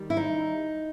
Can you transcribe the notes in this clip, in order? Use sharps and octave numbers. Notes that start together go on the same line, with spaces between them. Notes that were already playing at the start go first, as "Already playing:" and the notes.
Already playing: D#3 G3
E4
D#4